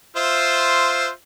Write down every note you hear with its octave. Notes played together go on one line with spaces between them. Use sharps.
F4 C5 E5